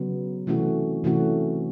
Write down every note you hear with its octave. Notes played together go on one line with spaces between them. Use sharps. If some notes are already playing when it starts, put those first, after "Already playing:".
Already playing: C#3 F#3 B3
C3 E3 A3 C#4 F#4
C3 E3 A3 C#4 F#4